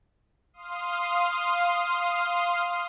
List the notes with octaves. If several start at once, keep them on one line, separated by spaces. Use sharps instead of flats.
F5 C6 D#6